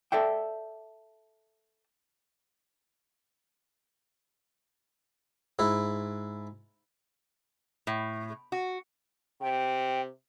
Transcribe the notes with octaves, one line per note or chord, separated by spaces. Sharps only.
A4 D5 E5 G5
G#2 E4
A2
F#4
C3 G5